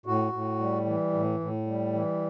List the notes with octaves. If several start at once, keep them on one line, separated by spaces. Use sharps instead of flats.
A2 F#4
A2
G3
E3
A2
A2
G3
E3